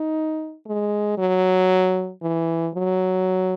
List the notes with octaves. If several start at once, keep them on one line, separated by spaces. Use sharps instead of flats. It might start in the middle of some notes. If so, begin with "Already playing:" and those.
Already playing: D#4
G#3
F#3
E3
F#3